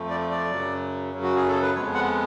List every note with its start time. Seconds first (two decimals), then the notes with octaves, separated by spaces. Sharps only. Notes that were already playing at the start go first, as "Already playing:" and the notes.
Already playing: F2 F3 A3
0.10 D5
0.30 D5
0.50 F#2 C#3 F#3
1.13 F#2 C#3 F#3
1.23 F#4
1.36 G#4
1.48 A4
1.62 B4
1.74 F2 F3 G#3 B3 C#5
1.94 F#5